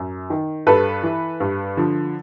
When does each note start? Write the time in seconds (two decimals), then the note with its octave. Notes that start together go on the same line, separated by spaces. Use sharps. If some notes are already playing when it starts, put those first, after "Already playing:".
Already playing: F#2
0.30 D#3
0.67 G2 A4 B4
1.03 E3
1.40 G2
1.77 D3 F3